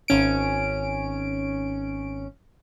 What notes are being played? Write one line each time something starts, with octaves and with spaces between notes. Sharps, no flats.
G#1 C#4 D7